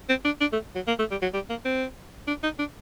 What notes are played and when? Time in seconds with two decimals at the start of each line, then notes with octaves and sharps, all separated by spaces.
0.09 C4
0.25 D4
0.41 D4
0.53 A3
0.75 F#3
0.88 A#3
0.99 A3
1.11 G3
1.22 F#3
1.34 G3
1.50 A#3
1.65 C4
2.28 D4
2.43 D#4
2.59 D4